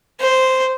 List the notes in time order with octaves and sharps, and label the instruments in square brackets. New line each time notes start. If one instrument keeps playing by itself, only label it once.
[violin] C5